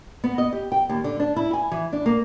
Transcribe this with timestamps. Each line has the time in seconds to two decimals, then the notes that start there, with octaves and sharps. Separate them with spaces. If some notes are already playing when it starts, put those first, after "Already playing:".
0.24 B3
0.38 D#5
0.53 G4
0.72 G5
0.89 D#2
1.04 D3
1.20 D4
1.36 E4
1.53 G#5
1.72 E3
1.92 D4
2.06 A#3